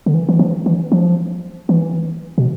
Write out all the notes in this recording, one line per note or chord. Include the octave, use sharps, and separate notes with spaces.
D3
E3
E3
F3
E3
F3
E3
B2